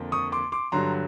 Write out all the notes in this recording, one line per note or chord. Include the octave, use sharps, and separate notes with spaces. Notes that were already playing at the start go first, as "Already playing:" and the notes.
Already playing: F2 D3 F3 A#3
C#6 D#6
C6 D6
C6 D6
G2 D3 F#3 A#5 C6